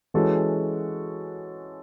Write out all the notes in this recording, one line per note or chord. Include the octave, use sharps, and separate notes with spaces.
E3 G#3 C#4 F#4 A4